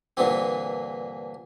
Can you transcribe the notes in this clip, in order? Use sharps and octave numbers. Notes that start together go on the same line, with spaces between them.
G2 A#2 D3 E3 C4